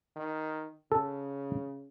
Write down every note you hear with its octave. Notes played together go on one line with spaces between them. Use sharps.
D#3
C#3 A4